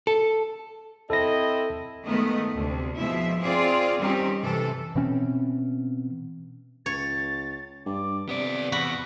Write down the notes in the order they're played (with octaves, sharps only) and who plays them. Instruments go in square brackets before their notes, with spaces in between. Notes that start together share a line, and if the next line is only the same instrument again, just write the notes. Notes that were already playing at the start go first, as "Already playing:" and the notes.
[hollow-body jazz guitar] A4
[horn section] C4 E4 [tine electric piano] A4 A#6 [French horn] D#5
[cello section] D#3 G#3 A3 B3 D#5
D2 C3
B2 F3 G#3 E4 E5
C4 F4 G#4 D5
D#3 G3 C4 C#4 D#4 G4
F#2 C3 E3 A4
[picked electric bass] B2 E3 C4 C#4
[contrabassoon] C#2 [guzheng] C#5 [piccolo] A6
[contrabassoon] G2 [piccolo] D6
[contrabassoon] C3 [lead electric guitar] B3 D5 [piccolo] B6
[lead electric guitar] E2 [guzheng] F#4 B5